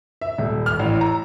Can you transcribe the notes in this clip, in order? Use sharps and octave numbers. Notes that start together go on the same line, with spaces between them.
E5
D#1
F6
A1
A#5